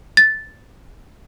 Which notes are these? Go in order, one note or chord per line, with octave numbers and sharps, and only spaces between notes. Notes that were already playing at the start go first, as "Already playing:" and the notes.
A6